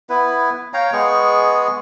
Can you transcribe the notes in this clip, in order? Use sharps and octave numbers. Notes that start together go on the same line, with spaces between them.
B3 E4 B4
C#5 F5 G5 A#5
G#3 B3 G#4 C#6